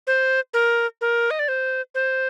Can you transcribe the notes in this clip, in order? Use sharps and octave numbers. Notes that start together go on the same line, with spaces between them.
C5
A#4
A#4
D#5
D5
C5
C5